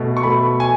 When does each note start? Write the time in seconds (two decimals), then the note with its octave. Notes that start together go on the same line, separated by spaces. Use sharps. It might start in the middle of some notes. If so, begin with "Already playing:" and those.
Already playing: B2 A3
0.17 C#6
0.23 B2 A3 B5
0.60 G#5